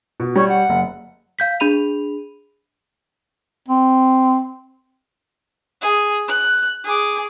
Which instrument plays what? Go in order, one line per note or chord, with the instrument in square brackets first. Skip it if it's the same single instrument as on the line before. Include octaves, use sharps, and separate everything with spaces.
[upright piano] B2
[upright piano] G3 [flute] C#5
[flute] F#5
[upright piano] F#1
[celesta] F5 G6 B6
D4 G#4 B5 D#7 F7
[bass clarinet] C4
[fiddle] G#4
F#6
G#4 D6